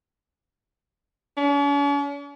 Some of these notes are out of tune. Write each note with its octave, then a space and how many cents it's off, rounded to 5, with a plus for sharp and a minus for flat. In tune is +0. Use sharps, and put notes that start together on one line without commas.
C#4 +45